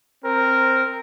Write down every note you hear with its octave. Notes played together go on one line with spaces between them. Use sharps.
C4 A#4